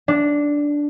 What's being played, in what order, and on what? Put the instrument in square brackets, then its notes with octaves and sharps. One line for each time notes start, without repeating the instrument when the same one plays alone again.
[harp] D4